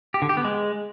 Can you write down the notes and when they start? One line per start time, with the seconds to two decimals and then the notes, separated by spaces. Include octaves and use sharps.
0.14 G4
0.22 D3
0.29 G4
0.37 B3
0.45 G#3